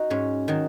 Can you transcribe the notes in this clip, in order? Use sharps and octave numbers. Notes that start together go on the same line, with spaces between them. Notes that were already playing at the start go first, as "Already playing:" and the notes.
Already playing: D#4 F#4
G#2 C#4
D#3 F#3